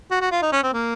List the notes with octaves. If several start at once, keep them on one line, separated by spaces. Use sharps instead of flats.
F#4
F#4
F4
D#4
C#4
C4
A#3